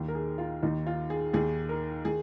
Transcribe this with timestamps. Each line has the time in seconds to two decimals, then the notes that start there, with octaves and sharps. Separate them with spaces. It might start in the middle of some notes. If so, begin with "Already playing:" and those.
Already playing: D#2 D#3
0.08 A#4
0.15 G#4
0.38 F4
0.63 D#2 D#3 D#4
0.87 F4
1.10 G#4
1.33 D#2 D#3 G#4
1.69 A#4
2.05 D#3 G#4